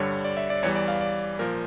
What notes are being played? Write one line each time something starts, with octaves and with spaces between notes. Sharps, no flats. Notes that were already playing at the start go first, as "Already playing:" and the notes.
Already playing: G2 D3 G3 C#5
D5
E5
D5
E2 E3 G3 C#5
D5
F5
D5
A#2 F3 A#4